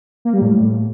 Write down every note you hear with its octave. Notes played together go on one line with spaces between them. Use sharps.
A#3
G3
A2